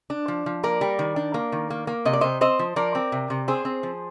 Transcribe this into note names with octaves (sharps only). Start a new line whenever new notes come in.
D4
F3
F3
A#3 A#4 D5
G3
D#3
D4
A#3
D#3
A#3
A#3
C3 D#5
D5
C3 C5 D#5
C4 C5 D#5
F3
F3 A#4 D5
C4
C3
C3
C4 G#4 C5
C4
F3